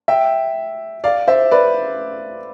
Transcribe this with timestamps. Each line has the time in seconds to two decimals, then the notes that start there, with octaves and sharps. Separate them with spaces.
0.08 E5 G5
1.04 D5 F5
1.27 C5 E5
1.51 B4 D5